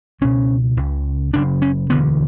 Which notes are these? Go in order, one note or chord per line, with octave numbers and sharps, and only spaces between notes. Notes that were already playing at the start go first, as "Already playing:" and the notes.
C#2 B2 C#4
C#2 C#3
F#1 F#2 C#3 D4
C#4
E1 D2 D3 B3